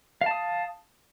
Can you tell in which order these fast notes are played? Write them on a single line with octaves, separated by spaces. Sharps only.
F5 A5 D#6